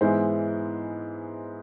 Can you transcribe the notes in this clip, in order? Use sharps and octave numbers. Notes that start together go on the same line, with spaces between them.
G#2 E3 G#3 B3 E4 C5